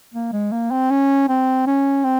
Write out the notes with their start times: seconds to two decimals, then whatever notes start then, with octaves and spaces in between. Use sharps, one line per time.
0.14 A#3
0.33 G#3
0.52 A#3
0.71 C4
0.90 C#4
1.28 C4
1.67 C#4
2.04 C4